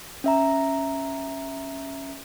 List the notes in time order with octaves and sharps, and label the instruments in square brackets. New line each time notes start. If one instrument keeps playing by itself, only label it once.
[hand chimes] C#4 E5 A#5